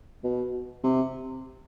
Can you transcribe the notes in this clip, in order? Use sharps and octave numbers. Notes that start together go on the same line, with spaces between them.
B2
C3